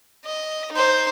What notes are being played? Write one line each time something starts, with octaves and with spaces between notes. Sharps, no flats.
D#5
D#4 C5